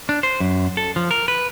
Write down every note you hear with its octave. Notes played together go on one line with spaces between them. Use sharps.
D4
C5
F#2
A4
F3
A#4
B4